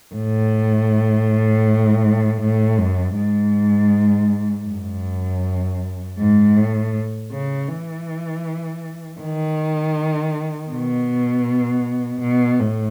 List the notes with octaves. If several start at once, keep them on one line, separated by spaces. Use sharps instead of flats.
A2
A2
F#2
G#2
F#2
G#2
A2
C#3
E3
D#3
B2
B2
A2